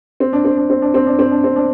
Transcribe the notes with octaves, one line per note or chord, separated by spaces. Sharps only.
C4
D4
C4
D4
C4
D4
C4
D4
C4
D4
C4
D4